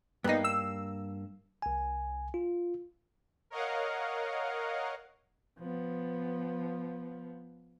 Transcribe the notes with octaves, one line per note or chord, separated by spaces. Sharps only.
G2 A#3 B3 D#4
E6
C2 G#5
F4
A#4 C#5 D#5 F5 F#5
F3 B3